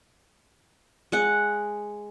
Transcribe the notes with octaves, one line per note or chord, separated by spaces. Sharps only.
G#3 F#5